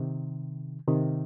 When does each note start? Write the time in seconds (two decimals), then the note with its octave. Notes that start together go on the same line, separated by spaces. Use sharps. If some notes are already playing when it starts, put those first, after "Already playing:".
Already playing: C3 D#3
0.87 C3 D#3